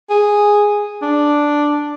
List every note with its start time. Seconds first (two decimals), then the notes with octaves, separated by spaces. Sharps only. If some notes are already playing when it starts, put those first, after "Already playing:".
0.10 G#4
1.02 D4